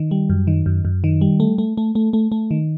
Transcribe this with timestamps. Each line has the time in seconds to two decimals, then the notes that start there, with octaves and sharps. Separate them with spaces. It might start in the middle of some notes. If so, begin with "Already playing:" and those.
Already playing: D#3
0.11 G3
0.30 F#2
0.47 D#3
0.66 F#2
0.85 F#2
1.04 D#3
1.21 G3
1.40 A3
1.58 A3
1.77 A3
1.95 A3
2.13 A3
2.32 A3
2.51 D#3